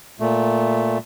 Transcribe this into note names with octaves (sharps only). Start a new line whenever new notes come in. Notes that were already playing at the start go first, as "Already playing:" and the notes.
A#2 A3